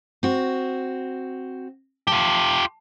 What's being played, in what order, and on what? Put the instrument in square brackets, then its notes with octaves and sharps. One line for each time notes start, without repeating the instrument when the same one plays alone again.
[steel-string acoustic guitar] C4 F#4
[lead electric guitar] F4 G4 [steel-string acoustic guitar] A5